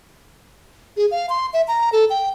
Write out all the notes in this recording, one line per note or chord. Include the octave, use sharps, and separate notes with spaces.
G#4
F5
C6
E5
A#5
A4
G5